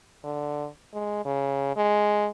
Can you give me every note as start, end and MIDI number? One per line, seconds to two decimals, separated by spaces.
0.24 0.67 50
0.93 1.23 56
1.25 1.74 49
1.76 2.28 56